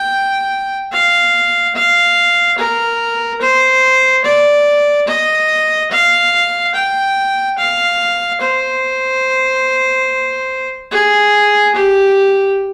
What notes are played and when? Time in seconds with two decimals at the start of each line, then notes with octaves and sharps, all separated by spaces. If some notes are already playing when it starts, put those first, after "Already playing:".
Already playing: G5
0.92 F5
1.75 F5
2.58 A#4
3.41 C5
4.25 D5
5.08 D#5
5.91 F5
6.75 G5
7.58 F5
8.41 C5
10.91 G#4
11.75 G4